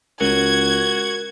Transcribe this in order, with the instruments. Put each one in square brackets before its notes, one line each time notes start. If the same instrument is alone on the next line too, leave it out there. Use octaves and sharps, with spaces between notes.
[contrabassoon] C#2 [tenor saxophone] F#4 [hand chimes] A#4 [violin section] G#6